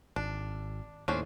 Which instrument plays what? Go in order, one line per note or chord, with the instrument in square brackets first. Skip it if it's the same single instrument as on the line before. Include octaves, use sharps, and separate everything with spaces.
[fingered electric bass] G#1 [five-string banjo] D4
[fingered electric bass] D#2 A2 [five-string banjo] C#4 D4 C5